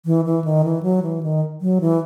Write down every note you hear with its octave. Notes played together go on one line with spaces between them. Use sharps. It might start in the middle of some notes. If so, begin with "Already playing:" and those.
E3
E3
D#3
E3
F#3
E3
D#3
F#3
E3